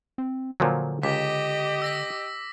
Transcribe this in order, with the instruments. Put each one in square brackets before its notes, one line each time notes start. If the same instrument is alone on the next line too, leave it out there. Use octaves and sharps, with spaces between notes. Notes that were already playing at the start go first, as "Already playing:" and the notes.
[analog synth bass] C4
[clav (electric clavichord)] A#2 F3 F#3 [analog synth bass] D3
[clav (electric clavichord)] C#2 [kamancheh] G4 D#5 [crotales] D6 B6
[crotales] E6 A#6 B6